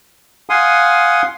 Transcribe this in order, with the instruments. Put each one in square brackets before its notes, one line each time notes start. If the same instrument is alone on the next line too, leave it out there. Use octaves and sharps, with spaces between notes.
[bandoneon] F5 F#5 G#5 C6 D#6